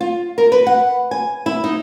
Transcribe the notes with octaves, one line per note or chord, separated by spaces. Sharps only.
F4
A#4
B4
F#5
G#5
E4
D#4